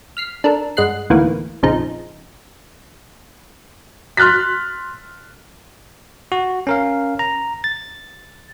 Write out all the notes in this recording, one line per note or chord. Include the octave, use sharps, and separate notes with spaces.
F6 B6 C7
D4 A4 A#4
G2 G#3 F#5 F#6 C7
D2 A2 D#3 E3 A#3 B3
A#1 F2 C#3 F3 D#4
C6 F6 F#6 A6 B6
F#4
C#4 A#4 F5
A#5
A6